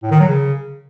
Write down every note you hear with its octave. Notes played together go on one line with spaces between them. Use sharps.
A2
D#3
F#3
C#3